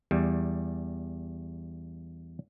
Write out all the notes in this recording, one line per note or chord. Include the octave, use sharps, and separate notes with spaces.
E2 G3